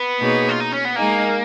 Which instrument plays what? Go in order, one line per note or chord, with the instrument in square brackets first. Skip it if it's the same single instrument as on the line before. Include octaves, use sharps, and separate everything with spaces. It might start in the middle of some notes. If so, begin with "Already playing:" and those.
Already playing: [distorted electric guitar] B3
[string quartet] B2 A#3 D#4 G#4 C#5
[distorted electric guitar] F4
D#4
C#4
B3
[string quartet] G#3 D#4 G#4 [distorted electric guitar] A#3